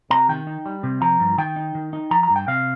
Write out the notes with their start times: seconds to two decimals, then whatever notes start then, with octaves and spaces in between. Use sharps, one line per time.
0.10 C3 A#5
0.29 D#3 G5
0.47 D#4
0.66 G3
0.83 C3
1.02 F3 A#5
1.20 G2
1.38 D#3 G5
1.56 D#4
1.75 D#3
1.93 D#4
2.11 F3 A#5
2.23 A#5
2.30 G2
2.36 G5
2.48 C3 F5